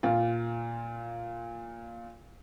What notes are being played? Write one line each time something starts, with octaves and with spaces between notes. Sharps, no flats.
A#2 F4